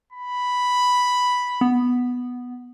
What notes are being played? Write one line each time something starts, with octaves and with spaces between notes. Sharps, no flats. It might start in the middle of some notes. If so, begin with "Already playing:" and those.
B5
B3